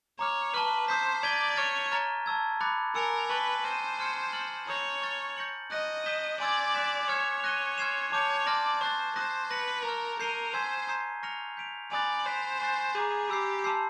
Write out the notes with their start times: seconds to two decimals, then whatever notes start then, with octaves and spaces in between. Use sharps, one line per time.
0.19 C#5 A#5 D6 F6
0.54 B4 A5 C#6 F6
0.88 C5 D#6 G6 B6
1.22 D5 D#6 G#6 B6 D#7 G7
1.57 C#5 F6 A6 D7 G7
1.92 A#5 C#6 F6 A6
2.26 A5 C#6 E6 G#6
2.61 B5 D6 F#6 A6 C#7
2.95 A#4 G#5 B5 E6 A6 C#7
3.30 B4 A5 C#6 F#6 A6 D7
3.64 C5 F6 A#6 D#7 G7
3.99 C6 F6 G#6 C#7
4.33 F6 A6 C#7 F#7
4.67 C#5 A#5 D#6 G6 A#6
5.02 C#6 F6 A6
5.37 G6 A#6 C#7 F#7
5.71 D#5 F#6 A#6 D#7
6.06 D#6 G6 B6 E7 G7
6.40 D5 G#5 C6 E6 G#6
6.74 D6 F#6 B6 E7
7.09 C#5 D6 F6 G#6 C#7 E7
7.44 F#6 A#6 D#7 G7
7.78 C6 F6 G#6 C7 E7
8.12 C#5 A5 D6 G6
8.47 D5 A5 C6 F6 A#6
8.81 C5 C#6 F#6 A6
9.16 C5 D#6 F#6 A#6
9.50 B4 F#6 A#6 C#7
9.84 A#4 A#5 C#6 F6
10.19 A#4 G6 C7 D#7 G7
10.54 C5 G#5 C6 E6 G#6 B6
10.88 A#5 D#6 G6 C7
11.23 C#6 F6 A#6 C#7 F7
11.57 G6 B6 D7 F7
11.92 D5 G#5 B5 D#6 F#6 A6
12.26 C5 F#6 B6 D7 F7
12.61 G#5 C#6 F#6 A6 C7
12.95 G#4 A#5 D6 G6
13.29 G4 B5 E6 G6 C7
13.64 A5 C6 E6 G6 C7